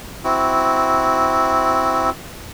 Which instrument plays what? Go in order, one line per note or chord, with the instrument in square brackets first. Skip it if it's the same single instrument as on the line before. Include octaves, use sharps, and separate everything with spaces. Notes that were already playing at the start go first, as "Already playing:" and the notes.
[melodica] C4 E4 F#4